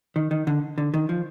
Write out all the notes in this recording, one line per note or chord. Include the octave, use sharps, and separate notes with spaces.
D#3
D#3
D3
D3
D#3
F3